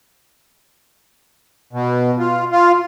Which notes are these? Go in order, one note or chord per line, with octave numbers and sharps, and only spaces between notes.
B2
F4
F4